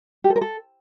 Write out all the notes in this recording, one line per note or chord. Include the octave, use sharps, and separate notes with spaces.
G4
A4
A#4
A4